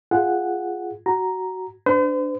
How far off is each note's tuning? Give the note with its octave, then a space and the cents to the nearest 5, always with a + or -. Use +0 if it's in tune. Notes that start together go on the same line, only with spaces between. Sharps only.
F4 +0 G#4 +0 F#5 +0
F#4 +15 A#5 +0
D4 +0 C5 -45